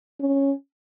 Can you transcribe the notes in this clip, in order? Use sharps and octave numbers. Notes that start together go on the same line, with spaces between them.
C#4